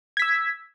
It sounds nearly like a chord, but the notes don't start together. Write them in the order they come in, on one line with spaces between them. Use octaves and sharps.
G#6 B6 E6